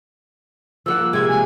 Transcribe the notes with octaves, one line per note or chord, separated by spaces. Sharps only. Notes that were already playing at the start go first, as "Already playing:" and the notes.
F3 A#3 F#5 E6
C3 G#3 C4 G#6
G#5